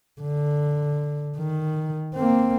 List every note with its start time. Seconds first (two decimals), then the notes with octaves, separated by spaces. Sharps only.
0.21 D3
1.37 D#3
2.14 A#3 C4